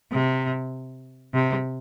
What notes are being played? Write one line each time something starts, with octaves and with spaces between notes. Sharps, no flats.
C3
C3